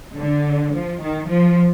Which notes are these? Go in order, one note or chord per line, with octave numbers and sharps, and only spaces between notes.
D3
F3
D#3
F3